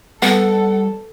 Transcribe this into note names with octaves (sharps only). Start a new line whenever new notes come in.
G3 B3 A4 F#5